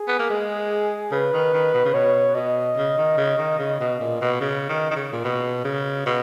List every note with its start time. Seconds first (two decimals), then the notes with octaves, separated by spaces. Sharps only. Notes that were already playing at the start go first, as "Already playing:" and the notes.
Already playing: G#4
0.08 B3
0.19 A#3
0.30 G#3
1.12 C#3 B4
1.33 D#3
1.54 D#3
1.74 B2
1.85 C#3
1.94 B2 C#5
2.35 B2 D#5
2.77 C#3
2.98 D#3
3.17 C#3
3.38 D#3
3.59 C#3
3.80 B2
4.00 A#2
4.21 B2
4.41 C#3
4.69 D#3
4.91 D#3
4.96 C#3
5.12 A#2
5.24 B2
5.65 C#3
6.06 B2